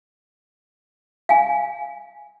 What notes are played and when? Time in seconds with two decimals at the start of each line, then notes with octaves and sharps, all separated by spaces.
1.29 F5 G#5